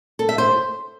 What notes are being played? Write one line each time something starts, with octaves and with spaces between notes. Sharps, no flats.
A4
E5
C5